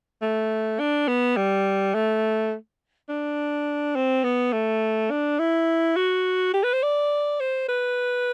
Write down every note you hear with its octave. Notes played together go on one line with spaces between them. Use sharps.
A3
D4
B3
G3
A3
D4
C4
B3
A3
D4
E4
F#4
G4
B4
C5
D5
C5
B4